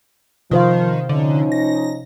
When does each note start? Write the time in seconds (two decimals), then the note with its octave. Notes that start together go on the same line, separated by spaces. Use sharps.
0.51 C3 D#3 F3 C5 F5
1.09 D3 F3 C#4 D#4
1.52 A#6